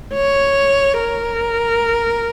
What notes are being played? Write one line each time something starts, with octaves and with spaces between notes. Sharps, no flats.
C#5
A#4